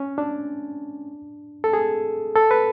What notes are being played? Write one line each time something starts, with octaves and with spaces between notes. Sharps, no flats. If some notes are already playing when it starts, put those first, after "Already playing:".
Already playing: C#4
D4
A4
G#4
A4
B4